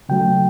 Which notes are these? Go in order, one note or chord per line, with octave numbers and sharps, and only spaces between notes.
C#3 F#3 A3 G5